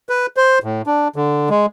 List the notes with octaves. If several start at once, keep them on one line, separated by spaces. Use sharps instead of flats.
B4
C5
A2
D4
D3
G#3